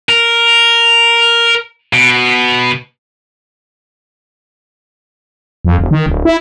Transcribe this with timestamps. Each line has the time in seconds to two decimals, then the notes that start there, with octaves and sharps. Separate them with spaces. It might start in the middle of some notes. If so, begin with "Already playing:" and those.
0.09 A#4
1.93 B2
5.65 F2
5.79 E1
5.91 D#3
6.06 D1
6.25 E4